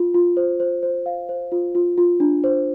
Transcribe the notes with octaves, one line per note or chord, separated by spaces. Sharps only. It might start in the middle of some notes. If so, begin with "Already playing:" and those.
Already playing: F4
F4
C5
C5
C5
F5
C5
F4
F4
F4
D4
C5